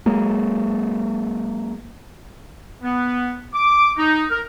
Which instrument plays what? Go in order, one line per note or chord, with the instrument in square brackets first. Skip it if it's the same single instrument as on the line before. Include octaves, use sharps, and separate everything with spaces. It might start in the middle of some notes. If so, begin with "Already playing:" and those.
[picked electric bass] F#3 G#3 A#3
[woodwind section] B3
D6
D#4
A#4